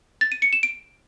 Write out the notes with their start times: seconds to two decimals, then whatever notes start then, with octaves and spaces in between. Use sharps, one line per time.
0.21 A6
0.32 D#7
0.42 C#7
0.53 E7
0.63 D7